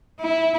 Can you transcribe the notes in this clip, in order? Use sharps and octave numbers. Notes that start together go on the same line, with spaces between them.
E4